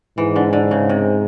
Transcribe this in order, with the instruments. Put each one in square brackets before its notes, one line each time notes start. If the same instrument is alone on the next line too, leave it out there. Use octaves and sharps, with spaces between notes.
[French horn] G#2 [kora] E3
[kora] D3
D3
C#3
C3